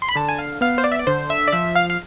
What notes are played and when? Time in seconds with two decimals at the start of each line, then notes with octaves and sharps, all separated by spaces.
0.02 C6
0.09 B5
0.16 D3 A5
0.29 G#5
0.39 F5
0.61 B3 F5
0.78 C5
0.84 D5
0.92 E5
0.99 D5
1.07 D3 C5
1.30 E5
1.48 D5
1.52 F3 E5
1.75 F5
1.90 F5